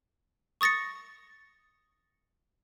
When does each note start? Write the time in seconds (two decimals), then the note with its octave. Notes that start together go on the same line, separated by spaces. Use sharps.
0.61 C#6 D#6 A6 A#6 C#7